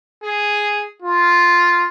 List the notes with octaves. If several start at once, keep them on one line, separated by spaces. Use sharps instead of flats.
G#4
F4